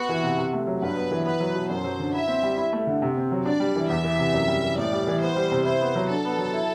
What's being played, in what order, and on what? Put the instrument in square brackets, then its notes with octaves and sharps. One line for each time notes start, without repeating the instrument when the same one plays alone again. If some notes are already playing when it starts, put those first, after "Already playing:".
Already playing: [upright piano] B3 [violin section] F#4
[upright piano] E3
C3
C3
A3
F#3
[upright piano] G2 [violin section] B4
[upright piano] B3
E3
[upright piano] B3 [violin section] B4
[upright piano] F#3
B2
[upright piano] F#2 [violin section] C5
[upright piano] F#3
D3
[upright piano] E4 [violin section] E5
[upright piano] C4
G3
E4
A3
D3
C3
C4
F#3
[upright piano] D4 [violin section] D5
[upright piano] G3
E3
[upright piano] E2 [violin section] E5
[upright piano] E3
C3
F#2
G3
E3
[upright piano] A2 [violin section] D5
[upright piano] G3
E3
[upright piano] B3 [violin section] C5
[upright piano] G3
C3
[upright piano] E4 [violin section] C5
[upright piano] B3
F#3
[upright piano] D4 [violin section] A4
[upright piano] B3
F#3
E4